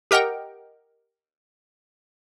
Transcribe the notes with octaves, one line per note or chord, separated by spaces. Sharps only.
G4 A#4 D#5 F#5 G5